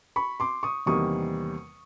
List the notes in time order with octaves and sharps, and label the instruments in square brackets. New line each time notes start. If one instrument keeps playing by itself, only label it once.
[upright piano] B5 C#6
C6 D6
C#6 D#6
E2 C3 D#3 G3 A#3 C#6 D#6